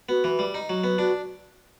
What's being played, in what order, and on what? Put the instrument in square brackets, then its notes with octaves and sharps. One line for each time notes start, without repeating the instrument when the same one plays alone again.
[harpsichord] B3 [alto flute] F#4
[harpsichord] E3
G3
D#4
F#3
B3
[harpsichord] D4 [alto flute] F#4